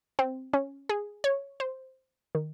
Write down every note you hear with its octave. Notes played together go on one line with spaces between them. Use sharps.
C4
C#4
G#4
C#5
C5
D#3